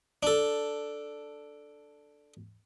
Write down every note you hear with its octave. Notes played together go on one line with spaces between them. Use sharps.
D4 A4